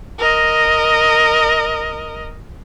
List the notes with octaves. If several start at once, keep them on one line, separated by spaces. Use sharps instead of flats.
A#4 D#5